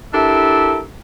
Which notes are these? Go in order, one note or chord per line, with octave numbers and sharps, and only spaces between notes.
D4 E4 G4 A4 A#4 E5